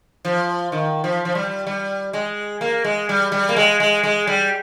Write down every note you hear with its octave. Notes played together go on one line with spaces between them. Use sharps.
F3
D#3
F3
F3
G3
G3
G#3
A#3
G#3
G3
G3
A#3
G#3
G#3
G#3
G3